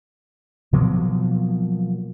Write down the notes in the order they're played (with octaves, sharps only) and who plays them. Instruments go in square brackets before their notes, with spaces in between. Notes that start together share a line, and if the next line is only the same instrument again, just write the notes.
[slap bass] B2 F3 F#3 A#3